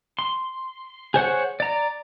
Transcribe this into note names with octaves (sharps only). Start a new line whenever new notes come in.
C6
G#4 C5 C#5 F#5
D5 A#5